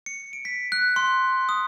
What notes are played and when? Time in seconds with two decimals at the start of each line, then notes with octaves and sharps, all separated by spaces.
0.06 C#7
0.33 D7
0.45 B6
0.72 F#6
0.96 C6
1.49 D#6